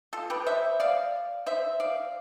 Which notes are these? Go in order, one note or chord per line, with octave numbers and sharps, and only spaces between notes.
F4 A4
G4 B4
C5 E5
D5 F5
C5 E5
D5 F5